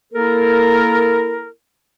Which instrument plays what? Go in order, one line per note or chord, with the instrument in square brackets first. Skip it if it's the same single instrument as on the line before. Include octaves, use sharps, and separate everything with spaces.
[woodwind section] A#3 E4 A4 A#4